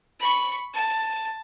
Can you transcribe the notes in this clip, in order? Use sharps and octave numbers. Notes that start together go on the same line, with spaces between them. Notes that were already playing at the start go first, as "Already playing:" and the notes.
B5 C#6
A5